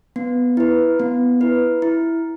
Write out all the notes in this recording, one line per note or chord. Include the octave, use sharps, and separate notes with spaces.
B3
E4 B4
B3
E4 B4
E4